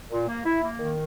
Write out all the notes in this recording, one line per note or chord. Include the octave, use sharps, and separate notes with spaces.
A#2
A#3
E4
A#3
D#3